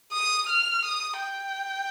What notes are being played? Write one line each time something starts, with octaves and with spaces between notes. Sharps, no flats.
D#6
F6
D#6
G5